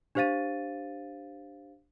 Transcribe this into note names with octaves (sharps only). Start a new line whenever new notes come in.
D4 G4 C5 F5 A6 D#7